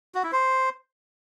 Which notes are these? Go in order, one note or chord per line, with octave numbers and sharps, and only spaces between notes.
F#4
E4
C5